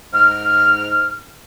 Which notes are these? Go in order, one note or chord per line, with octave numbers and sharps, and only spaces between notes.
G#2 F6